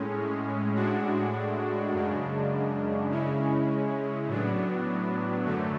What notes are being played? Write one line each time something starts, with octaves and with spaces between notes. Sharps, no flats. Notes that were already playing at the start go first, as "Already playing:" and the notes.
Already playing: A2 G#3 C#4
A2 G#3 D4 F#4
F#2 C#3 G#3 D4
C#3 G#3 C#4 E4
A2 F#3 B3 D4
F#2 D3 F#3 A3